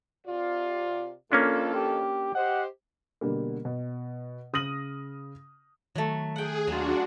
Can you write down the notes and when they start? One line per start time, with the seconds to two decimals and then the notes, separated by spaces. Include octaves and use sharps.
0.27 C3 F4 D5
1.32 F2 A#3 C#4 D4 F4 A4
1.75 G4
2.35 G4 C5 D#5 F#5
3.21 B2 D3 G3 A#3
3.65 B2
4.53 C#3 D#6 F6 A#6 D#7 F#7
5.95 D#3 F#3 A3
6.36 G#4 F#5 G5
6.68 D#2 F#3 D4 F4 F#4